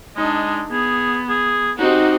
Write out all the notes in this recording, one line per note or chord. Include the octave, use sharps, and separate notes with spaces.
G#3 D4 D#4
B3 G#4
G#4
C4 D#4 F#4 G4 F#5